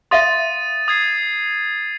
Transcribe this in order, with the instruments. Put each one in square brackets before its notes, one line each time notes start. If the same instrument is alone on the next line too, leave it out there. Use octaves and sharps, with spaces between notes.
[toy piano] E5 F5 C6 [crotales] D#6 A6 D#7
[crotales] D#6 G#6 C7